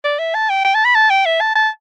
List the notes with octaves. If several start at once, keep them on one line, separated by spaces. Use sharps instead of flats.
D5
E5
A5
G5
G5
A5
B5
A5
G5
E5
A5
A5